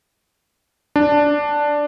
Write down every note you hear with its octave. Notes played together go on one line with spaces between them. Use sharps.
D4